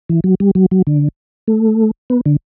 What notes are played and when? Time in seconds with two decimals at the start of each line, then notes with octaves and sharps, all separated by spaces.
0.09 E3
0.24 F#3
0.40 G3
0.55 F#3
0.71 F#3
0.87 D3
1.48 A3
2.10 B3
2.26 D3